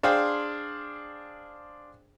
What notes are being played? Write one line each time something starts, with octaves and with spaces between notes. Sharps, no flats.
D4 G#4 C5 F5 G5 C6